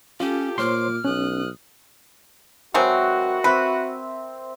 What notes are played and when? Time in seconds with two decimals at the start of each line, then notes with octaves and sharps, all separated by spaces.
0.20 C#4 F4 G4 A4
0.58 A#2 C5 C#5 C6 D6 F6
1.05 B1 C#4 D#6 F#6
2.74 F#3 G#3 C4 F#4 A#4 B4 E5
3.44 C4 B4 C5 E5